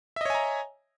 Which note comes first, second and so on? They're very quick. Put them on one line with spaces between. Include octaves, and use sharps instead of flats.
E5 D#5 C#5 G#5 A#5